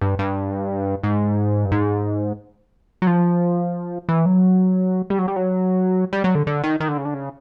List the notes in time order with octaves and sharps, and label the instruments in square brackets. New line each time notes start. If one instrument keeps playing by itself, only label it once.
[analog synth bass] G2
G2
G#2
G2
G#2
F#3
F3
E3
F#3
G3
F#3
G3
F#3
G3
F#3
D3
D3
D#3
D#3
D3
C#3
D3
C#3